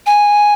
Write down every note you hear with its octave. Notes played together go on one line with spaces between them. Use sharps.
G#5